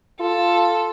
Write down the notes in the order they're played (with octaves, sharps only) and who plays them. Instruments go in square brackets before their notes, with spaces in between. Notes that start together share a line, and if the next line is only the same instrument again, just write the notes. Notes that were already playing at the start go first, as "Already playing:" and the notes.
[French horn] F4 [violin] A4